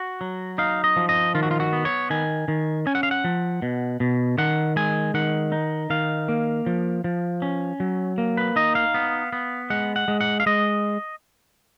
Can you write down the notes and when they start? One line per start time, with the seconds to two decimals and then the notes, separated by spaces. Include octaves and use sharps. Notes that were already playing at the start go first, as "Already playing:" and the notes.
Already playing: F#4
0.21 F#3
0.58 D#4 F5
0.84 D#5
0.96 F3
1.09 D#5
1.35 D#3 F4
1.43 F#4
1.51 F4
1.60 F#4
1.73 B3
1.85 C#5
2.10 D#3 G#5
2.48 D#3
2.87 C#4 G#5
2.95 F#5
3.03 F5
3.11 F#5
3.24 F3
3.62 B2
4.00 B2
4.38 D#3 F#5
4.76 G#3 G#5
5.14 D#3 F#5
5.52 D#4
5.90 D#3 F5
6.29 A#3
6.66 F3
7.04 F3
7.42 C#4
7.80 F#3
8.18 A#3
8.37 B4
8.56 D#4 D#5
8.75 F5
8.94 B3
9.33 B3
9.70 G#3 F#5
9.96 F#5
10.08 G#3
10.21 F#5
10.40 F5
10.46 G#3 D#5